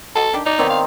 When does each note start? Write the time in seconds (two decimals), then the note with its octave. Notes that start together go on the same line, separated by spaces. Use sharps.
0.16 F#4 A4 D#5 C6
0.34 D#3 D4 G4
0.46 D#4 D5
0.59 D#3 B3 C4 C#5 D5
0.70 F5